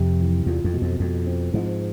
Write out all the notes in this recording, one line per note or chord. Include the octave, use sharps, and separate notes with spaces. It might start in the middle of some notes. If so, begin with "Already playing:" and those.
Already playing: F2 C3
E3
E2 F4
F2
B2
F2
F2 B2
C4
G#2 F3